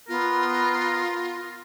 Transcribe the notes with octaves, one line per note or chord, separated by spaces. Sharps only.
B3 F4 A#4